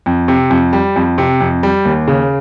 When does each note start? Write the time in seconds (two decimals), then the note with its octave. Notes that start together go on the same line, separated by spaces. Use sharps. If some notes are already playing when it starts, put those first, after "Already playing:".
0.06 F2
0.28 C3
0.50 F2
0.73 G3
0.96 F2
1.18 C3
1.41 F2
1.63 G3
1.85 D#2
2.08 C#3